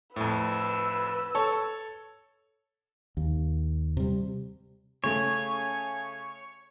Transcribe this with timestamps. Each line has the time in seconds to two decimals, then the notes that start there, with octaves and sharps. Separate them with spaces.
0.16 F2 A2 B4 E6
1.35 A4 C#5
3.17 D#2
3.97 C3 G3
5.04 C#3 A3 C#5 G#5